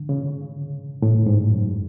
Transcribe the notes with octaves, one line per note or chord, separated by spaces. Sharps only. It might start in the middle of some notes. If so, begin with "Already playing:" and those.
Already playing: D3
C#3
A2
G#2
F#2